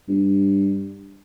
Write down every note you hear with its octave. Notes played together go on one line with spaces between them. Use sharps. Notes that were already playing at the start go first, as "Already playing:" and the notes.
G2